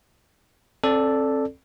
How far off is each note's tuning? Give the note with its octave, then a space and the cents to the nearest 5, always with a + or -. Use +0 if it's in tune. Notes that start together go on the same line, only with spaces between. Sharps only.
C4 +35 A4 +0 D5 +0